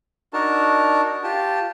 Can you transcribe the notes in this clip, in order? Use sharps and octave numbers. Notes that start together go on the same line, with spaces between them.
D4 D#4 F#4 A#4 A5
F4 G4 A5